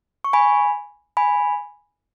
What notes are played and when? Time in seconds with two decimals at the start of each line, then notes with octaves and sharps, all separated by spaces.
0.24 C#6
0.33 G#5 B5
1.17 G#5 B5